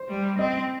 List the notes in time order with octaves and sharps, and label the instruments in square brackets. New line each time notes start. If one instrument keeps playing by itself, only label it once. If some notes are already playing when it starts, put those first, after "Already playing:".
Already playing: [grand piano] C5
[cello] G3
[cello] C4 [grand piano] D#5